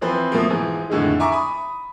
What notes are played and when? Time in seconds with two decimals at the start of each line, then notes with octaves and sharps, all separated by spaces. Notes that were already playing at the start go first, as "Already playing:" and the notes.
0.01 E3 F3 C4 B4 C5
0.32 B2 F3 A3 A#3
0.50 G#2 E3 F3
0.90 F2 A2 D3 D#3 G#3
1.20 E5 G#5 A#5 C#6 D6
1.32 B5 D#6